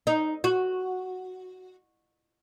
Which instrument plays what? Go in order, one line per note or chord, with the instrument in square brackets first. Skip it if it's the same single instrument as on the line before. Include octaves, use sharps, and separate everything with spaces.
[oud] D#4
F#4